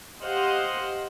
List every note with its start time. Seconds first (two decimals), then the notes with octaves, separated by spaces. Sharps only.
0.22 G4 C5 D#5 F5 F#5